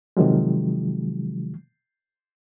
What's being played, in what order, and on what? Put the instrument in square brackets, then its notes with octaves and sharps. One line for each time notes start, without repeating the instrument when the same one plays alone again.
[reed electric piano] C3 D#3 F3 F#3 G#3